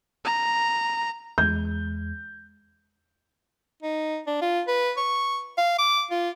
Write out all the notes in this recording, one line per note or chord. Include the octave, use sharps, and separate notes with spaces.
A#5
E2 G#3 G6
D#4
D4
F4
B4
C#6
F5
D6
F4